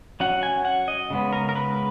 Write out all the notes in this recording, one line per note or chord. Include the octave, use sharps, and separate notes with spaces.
F#3 C#4 F#5
G#5
F#5
D#5
C#3 G#3 B3
A#4
A#4
B4